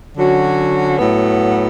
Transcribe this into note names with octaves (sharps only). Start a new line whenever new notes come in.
D3 F#3 C#4 F#4
A2 F#3 B3